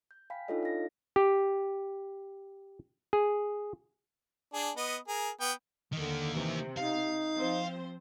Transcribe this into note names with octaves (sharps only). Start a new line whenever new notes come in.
G6
F5 G5 G#5 B5 B6
D4 D#4 F4 A4 C#5 D#5
F5 A#6
G4
G#4
D4 G#4
B3 D#5
G#4 A#4
B3 G5
D3 D#3 A#3
C3 E3
D#4 F5
F3 C4 C5